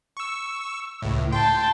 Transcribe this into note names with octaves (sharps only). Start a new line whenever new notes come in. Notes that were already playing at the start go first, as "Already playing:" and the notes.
C#6 E6
C#2 A2
G5 A5 C6